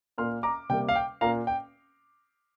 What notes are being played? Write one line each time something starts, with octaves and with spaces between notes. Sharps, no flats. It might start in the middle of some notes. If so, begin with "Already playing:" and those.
A#2 A#3 C6 F6
A#5 D6
C3 G3 A#3 G5
F5
G5
A#2 A#3 F5 A#5
G5